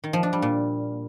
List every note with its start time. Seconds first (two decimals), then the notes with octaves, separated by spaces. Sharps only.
0.04 D#3
0.13 F3
0.23 D4
0.33 G3
0.42 A#2